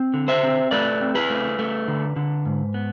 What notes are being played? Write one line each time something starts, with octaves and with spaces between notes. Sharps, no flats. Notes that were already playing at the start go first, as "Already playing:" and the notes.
Already playing: C4
D3
C5 E5
C4
A3 B4 D5
C4
G#4 B4
A3
A3
D3
D3
G#2
B3